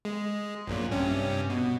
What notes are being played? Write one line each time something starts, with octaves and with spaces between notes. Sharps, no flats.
G#3
A#1 F#2 A#2
G2 C3 C#4
B2